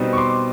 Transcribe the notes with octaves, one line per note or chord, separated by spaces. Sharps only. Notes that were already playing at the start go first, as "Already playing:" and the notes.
Already playing: B2 G3 C4 D#4
C#6
C6 D6